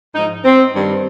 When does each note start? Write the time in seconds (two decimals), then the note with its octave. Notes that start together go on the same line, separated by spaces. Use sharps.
0.15 G#2 F3 D#4
0.44 C4
0.74 G2 D#3 G3